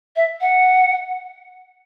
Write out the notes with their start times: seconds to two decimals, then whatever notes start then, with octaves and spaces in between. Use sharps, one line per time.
0.16 E5
0.41 F#5